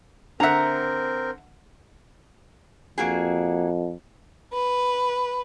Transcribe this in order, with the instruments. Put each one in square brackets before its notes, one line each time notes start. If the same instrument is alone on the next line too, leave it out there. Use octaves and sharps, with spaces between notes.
[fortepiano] D3 F#5 [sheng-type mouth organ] C4 A#4 [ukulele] E5 A#5
[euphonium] F2 [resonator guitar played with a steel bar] A#3 F#4 G#4
[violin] B4